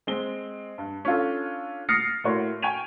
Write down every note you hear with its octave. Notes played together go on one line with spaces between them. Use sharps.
G#3 C4 G7
G2
C#4 D4 F4 A4
D#6 F6 A6 A#6 C7 C#7
A2 A#3 F#4 C#5 C6
G5 G#5 C#6 G#6 D#7 F7